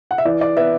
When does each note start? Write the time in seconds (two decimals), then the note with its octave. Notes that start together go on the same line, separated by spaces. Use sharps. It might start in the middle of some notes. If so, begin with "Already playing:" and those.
0.11 F#5
0.18 E5
0.25 E3 D5
0.41 D5
0.57 B3 E5